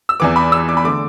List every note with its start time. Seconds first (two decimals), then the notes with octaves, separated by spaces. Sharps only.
0.09 E6
0.20 E2 E3 B3 D6
0.36 B5
0.52 E6
0.69 D6
0.77 B5
0.84 D3 A3 D6